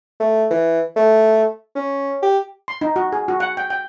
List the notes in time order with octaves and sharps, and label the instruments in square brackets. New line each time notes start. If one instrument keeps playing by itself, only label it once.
[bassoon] A3
E3
A3
C#4
G4
[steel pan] C6
D#4
F#4
G#4
F#4
F#5
G5
G5